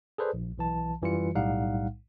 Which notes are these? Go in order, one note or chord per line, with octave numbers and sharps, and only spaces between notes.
G#4 A4 B4 C5 D5
A#1
B1 E3 A5
F#2 E3 G3 F4 C#7
B1 A2 G3 D#4 F5 F#5